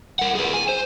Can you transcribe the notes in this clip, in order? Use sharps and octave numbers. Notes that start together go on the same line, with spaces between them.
A#4 F#5
G#4 B4
G#5
C5